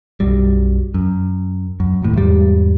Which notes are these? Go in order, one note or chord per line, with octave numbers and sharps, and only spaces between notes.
B1 F#2 F#3 G3
F#2
F#2
D1 D#2 A2
E2 G#2 G3